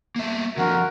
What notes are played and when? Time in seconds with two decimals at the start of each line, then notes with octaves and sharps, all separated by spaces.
0.16 A#3 B3 E5
0.58 D3 F3 C4 F#4 A#4